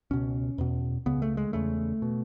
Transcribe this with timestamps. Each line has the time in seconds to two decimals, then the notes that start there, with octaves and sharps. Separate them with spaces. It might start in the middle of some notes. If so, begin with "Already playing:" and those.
0.11 C#2 B2 C#4
0.58 E2 B2
1.06 C#2 C#3 B3
1.22 A3
1.37 G#3
1.53 E2 C#3 A3
2.02 B2